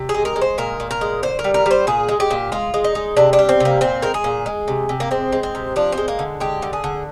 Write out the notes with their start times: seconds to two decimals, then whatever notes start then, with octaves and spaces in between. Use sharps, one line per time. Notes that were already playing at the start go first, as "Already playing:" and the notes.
Already playing: C3
0.09 G#4
0.14 G#3
0.25 A#4
0.36 G#3
0.42 C5
0.58 A#2 A#4
0.80 A#2
0.91 A#4
1.01 G#3
1.23 D3 C5
1.39 A#4
1.44 G3
1.54 A#4
1.66 G3 C5
1.87 A#2 G#4
2.09 G#3
2.20 G4
2.30 A#2
2.52 G#3 F4
2.74 G#3
2.84 D#4
2.95 G#3
3.17 C3 D4
3.33 D4
3.39 G3
3.49 C4
3.60 C3 A#3
3.81 A#2 C4
4.02 G#3 A#4
4.14 G#4
4.24 A#2
4.46 G#3
4.68 C3
4.89 C3
5.00 A#3
5.11 G#3 C4
5.32 G#3
5.43 C4
5.55 C3
5.76 F3 D4
5.92 C4
5.98 G#3
6.08 A#3
6.19 D3
6.40 G#3 G4
6.62 D3
6.73 G#4
6.84 D3